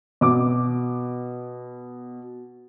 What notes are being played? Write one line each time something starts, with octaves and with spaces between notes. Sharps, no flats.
B2 D6